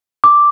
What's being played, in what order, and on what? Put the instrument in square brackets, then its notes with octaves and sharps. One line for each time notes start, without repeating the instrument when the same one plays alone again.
[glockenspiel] D6